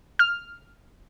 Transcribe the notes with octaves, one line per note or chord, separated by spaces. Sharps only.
F6